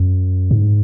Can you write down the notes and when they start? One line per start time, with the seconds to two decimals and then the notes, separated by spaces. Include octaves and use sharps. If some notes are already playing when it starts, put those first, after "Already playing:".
Already playing: F#2
0.51 G#2